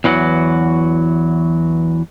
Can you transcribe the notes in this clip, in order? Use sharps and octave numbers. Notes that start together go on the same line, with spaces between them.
E2 E3 F#3 F#4